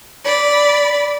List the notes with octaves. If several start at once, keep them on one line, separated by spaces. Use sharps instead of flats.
D5 B5